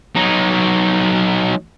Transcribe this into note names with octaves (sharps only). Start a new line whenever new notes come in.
F#3 D#4